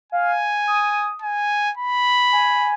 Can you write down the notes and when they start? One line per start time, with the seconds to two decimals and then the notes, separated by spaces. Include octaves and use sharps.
0.12 F5 G#5
0.67 D#6
1.22 G#5
1.77 B5
2.32 G#5